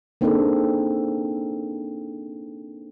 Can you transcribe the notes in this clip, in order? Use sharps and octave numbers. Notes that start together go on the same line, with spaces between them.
A#3 C4 D4 D#4 G#4 A4